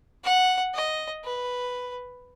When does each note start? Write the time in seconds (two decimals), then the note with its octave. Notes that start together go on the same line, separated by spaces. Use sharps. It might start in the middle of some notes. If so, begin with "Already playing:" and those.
0.24 F#5
0.74 D#5
1.24 B4